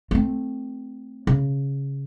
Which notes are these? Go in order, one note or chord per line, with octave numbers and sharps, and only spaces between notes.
A3 C4
C#3